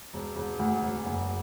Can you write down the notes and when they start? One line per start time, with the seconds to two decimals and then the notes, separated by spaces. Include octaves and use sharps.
0.13 E1
0.36 E1
0.59 D2
0.82 E1
1.06 F#1